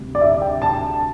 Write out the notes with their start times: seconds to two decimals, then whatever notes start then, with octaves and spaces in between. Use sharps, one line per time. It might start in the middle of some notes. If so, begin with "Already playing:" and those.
Already playing: D2 C3 G3
0.15 D5
0.21 E5
0.41 G5
0.62 A5